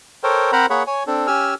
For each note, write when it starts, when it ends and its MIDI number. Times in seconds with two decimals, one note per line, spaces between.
0.23 0.51 69
0.23 0.51 70
0.23 0.51 72
0.23 0.51 73
0.23 0.51 79
0.52 0.66 60
0.52 0.66 70
0.52 0.66 72
0.52 0.66 78
0.52 0.66 82
0.52 0.66 83
0.70 0.83 58
0.70 0.83 68
0.70 0.83 73
0.70 0.83 78
0.70 0.83 83
0.87 1.03 73
0.87 1.03 80
1.07 1.27 60
1.07 1.27 62
1.07 1.27 69
1.27 1.54 61
1.27 1.54 67
1.27 1.54 80
1.27 1.54 88
1.27 1.54 89